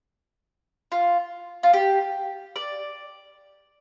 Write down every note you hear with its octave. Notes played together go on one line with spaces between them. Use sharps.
F4
F4
G4
D5